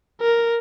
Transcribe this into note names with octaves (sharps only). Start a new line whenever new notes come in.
A#4